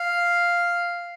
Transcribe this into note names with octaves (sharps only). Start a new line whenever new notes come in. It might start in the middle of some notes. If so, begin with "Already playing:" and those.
Already playing: F5